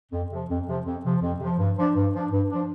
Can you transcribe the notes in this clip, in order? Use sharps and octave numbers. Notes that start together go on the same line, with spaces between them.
F2
C3 F3
F2
C3 F3
F2
C3 F3
F2
C3 F3
G2
F3 D4
G2
F3 D4
G2
F3 D4